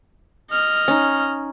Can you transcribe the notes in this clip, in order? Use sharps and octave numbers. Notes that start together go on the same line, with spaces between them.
D#5 F6
C#4 D#4